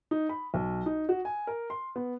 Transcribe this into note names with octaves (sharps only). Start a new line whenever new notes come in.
D#4
B5
B1
D#4
F#4
G#5
A#4
C6
B3